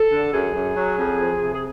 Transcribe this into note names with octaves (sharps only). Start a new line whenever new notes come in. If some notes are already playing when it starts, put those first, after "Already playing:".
Already playing: A4
D3
F#2 G#4
F#2
F#3
F2
F3
C3
G#4